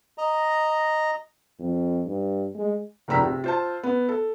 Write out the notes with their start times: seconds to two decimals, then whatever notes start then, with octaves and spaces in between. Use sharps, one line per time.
0.18 D#5 A#5
1.60 F2
2.06 G2
2.55 G#3
3.08 F1 C#2 A#2 A#5 E6 B6
3.21 C3
3.44 F4 C5 A5
3.83 B3
4.09 A4